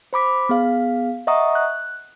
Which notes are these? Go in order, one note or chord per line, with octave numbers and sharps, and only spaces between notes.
C5 B5 D6 B6
B3 G#4 F5
D#5 E5 F#5 A#5 C#6 D#6
F#6